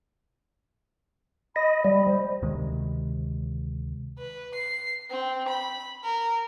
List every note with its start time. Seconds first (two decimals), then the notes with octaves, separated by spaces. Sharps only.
1.56 D#5 B5
1.84 G3
2.06 C5
2.42 D2 C3 D#3 G#3
4.18 B4
4.54 C7
5.10 C4
5.48 B5
6.04 A#4